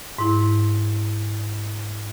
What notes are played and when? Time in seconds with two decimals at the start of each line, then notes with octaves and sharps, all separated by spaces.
0.18 G#2 E4